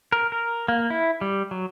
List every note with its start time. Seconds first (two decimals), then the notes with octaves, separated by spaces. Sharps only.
0.12 A#4
0.32 A#4
0.68 A#3
0.90 E4
1.21 G3
1.51 F#3